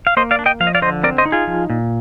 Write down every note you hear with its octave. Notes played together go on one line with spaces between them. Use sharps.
F5
A#3 C5 D#5
D5 F5
D4
D#5 G5
F3 F5
D#5
D5 F5
D3 C5 D#5
C4 A#4 D5
C5 D#5
D#4
F4 G#4
F3
A#2